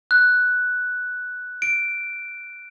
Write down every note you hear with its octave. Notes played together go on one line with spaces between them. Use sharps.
F#6
D7